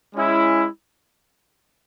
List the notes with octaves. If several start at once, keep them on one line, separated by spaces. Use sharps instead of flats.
G#3 C#4 E4